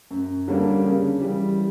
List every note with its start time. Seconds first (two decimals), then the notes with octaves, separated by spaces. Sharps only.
0.11 F#2
0.48 D3 G3 A#3 C#4
0.84 C#3
1.21 E3 G3